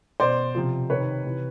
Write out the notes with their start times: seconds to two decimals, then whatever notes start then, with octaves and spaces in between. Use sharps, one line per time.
0.20 B2 C5 D5
0.55 C3 F3
0.90 C3 D#3 B4 C#5
1.25 C3 E3